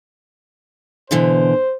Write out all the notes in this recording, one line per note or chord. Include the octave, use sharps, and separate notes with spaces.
B2 D3 E3 C5